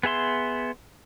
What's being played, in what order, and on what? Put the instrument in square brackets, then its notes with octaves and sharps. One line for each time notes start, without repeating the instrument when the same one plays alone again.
[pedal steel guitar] B3 G#4 E5 C6